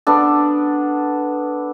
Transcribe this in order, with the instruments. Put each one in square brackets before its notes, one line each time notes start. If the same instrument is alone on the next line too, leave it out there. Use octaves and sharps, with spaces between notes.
[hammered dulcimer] B3 D4 A4